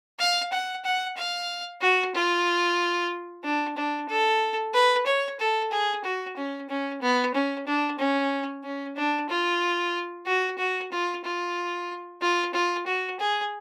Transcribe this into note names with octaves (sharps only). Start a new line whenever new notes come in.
F5
F#5
F#5
F5
F#4
F4
D4
D4
A4
B4
C#5
A4
G#4
F#4
C#4
C#4
B3
C#4
D4
C#4
C#4
D4
F4
F#4
F#4
F4
F4
F4
F4
F#4
G#4